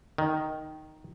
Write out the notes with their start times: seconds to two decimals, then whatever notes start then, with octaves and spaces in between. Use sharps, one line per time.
0.18 D#3